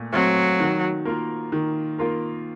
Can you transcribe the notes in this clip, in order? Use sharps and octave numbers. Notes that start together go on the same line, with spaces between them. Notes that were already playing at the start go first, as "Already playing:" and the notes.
Already playing: A#2 A3
F#3 A3 C4
D#3
A#3 F4 A#4
D#3
A#3 F4 A#4